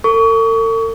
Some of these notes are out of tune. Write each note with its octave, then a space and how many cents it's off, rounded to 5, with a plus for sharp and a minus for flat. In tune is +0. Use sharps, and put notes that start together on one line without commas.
A4 +45 C#6 +30